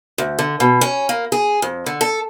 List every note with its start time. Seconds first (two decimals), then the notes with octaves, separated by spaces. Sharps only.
0.18 D2
0.39 D3
0.60 B2
0.81 C#4
1.09 A#3
1.32 G#4
1.62 F2
1.86 D3
2.01 A4